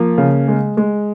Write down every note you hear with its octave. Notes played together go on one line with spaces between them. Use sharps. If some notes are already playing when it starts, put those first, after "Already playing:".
Already playing: F3 A#3
C#3
G#3
G#3